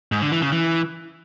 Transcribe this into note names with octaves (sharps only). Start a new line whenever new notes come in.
G#2
D3
E3
C#3
E3